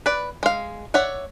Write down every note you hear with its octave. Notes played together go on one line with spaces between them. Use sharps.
B4 D5
G#3 F5
C#5 D5 E5 F#5